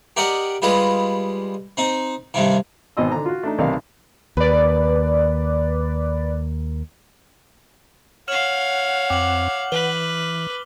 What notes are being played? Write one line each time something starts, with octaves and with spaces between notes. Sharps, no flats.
G4 A#4 D5 D#5 F#5 D6
G3 G#3 F4 B4 D#5
C4 D#4
G2 C3 D#3
G#1 B2 C4 D#5 C6 E6
D3 A#5
F4 F#4
A3 D4 D#4
B1 C3 D#3 A#4 D5 F5
D#2 B4 D5
C#5 F5 F#5 F6 E7 F#7
F2 C4 D6 F#7
E3 B4 G7